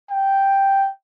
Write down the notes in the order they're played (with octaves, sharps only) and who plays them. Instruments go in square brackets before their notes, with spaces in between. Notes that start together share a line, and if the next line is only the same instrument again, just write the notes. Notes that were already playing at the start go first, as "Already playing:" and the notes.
[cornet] G5